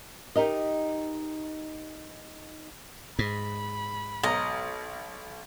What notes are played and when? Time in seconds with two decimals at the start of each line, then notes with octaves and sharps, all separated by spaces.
0.36 D#4 G4 A#4 D#5
3.19 G#2 B5
4.23 B1 D#5 A#5